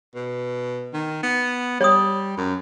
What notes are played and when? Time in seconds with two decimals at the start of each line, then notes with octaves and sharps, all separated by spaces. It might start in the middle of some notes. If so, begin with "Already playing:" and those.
0.15 B2
0.94 D#3
1.23 B3
1.81 G3 C#5 D#6
2.37 F#2